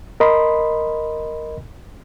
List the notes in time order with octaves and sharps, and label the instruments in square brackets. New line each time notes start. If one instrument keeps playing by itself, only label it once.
[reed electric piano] A#4 D#5 B5 C6